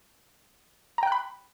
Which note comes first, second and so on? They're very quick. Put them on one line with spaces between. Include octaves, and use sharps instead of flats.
A#5 G5 F#6 B5